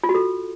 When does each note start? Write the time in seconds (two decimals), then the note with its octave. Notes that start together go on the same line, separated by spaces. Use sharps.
0.03 F4
0.09 F#4
0.15 A4